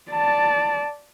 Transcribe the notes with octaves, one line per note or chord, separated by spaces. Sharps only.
D5 A5